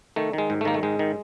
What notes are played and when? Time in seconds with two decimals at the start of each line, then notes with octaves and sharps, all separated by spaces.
0.16 D#3 A3
0.33 D#3 G#3
0.50 G#2
0.61 A3
0.65 D#3 A#3
0.74 A3
0.83 G#2 G#3
0.99 D#3